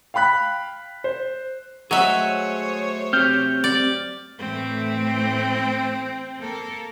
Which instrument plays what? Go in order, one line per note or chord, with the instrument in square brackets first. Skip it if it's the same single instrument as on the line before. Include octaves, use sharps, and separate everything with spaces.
[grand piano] F5 G5 B5 F#6 B6
C5
[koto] F#3 E5 [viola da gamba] A3 C5 C#5 [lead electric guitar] G#4 D#5
[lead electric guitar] C4 G4 [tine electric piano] F6 G6
[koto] D5
[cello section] A2 E3 A3 [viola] C4
[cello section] A#3 A4 A#4